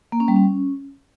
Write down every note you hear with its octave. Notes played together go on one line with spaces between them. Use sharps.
A#3
C#4
G3
C#4